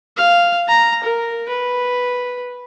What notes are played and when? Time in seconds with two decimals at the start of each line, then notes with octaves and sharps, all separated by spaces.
0.17 F5
0.69 A#5
1.04 A#4
1.49 B4